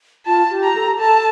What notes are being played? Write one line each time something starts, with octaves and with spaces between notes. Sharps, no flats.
F4 A5
G4
A#5
A4
A4 A5